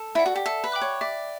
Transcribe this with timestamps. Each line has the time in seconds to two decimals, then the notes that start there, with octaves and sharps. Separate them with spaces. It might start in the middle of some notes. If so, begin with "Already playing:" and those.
Already playing: A4
0.15 E4 D5 F#5
0.26 F#4
0.36 G4
0.46 A4 E5
0.64 B4
0.72 G5 B5 D6 F#6
0.81 C#5
1.01 D5 E5